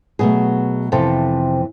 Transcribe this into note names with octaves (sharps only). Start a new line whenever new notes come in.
B2 F#3 A3 G#4
F2 C3 E3 A4